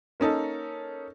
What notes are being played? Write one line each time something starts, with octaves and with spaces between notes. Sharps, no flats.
A#3 C#4 D#4 A4